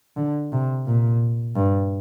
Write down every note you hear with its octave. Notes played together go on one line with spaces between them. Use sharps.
D3
C3
A#2
G2